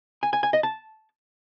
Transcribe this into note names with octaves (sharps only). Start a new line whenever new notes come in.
G#5
G#5
G#5
D#5
A5